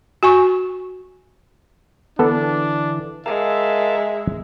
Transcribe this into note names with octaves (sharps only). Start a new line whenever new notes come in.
F#4 G#5 C#6
D3 E3 B3 D4 A4
G#3 A#4 E5 F5 A5